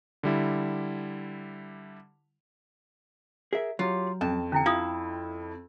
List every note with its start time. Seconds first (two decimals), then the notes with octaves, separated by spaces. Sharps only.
0.23 D3 G3 E4
3.53 G#4 A#4 E5
3.79 F#3 F4 G4 C#5
4.21 F2 C#4 A5
4.52 D3 C#4 E4 G5
4.66 E4 F4 F5 D#6